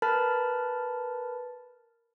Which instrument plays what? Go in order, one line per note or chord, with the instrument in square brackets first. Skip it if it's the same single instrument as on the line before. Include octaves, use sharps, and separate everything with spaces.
[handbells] A#4 B4 A5 B5 F6 A6